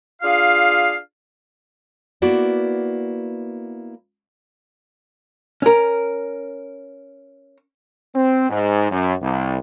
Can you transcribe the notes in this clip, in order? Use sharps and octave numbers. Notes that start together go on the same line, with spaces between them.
D4 F4 G#4 F5
A#3 B3 E4 F#4 D5
C#4 A#4
C4
G#2
F#2
C2